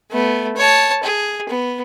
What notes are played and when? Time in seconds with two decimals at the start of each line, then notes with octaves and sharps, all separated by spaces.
0.11 A3 B3
0.56 C#5 A5
1.03 G#4
1.49 B3